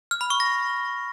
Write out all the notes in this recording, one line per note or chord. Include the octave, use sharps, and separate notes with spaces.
F6
B5
C#6
A#6